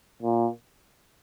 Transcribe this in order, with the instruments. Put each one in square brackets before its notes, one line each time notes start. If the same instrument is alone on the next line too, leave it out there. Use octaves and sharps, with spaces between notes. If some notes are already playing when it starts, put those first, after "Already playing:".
[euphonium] A#2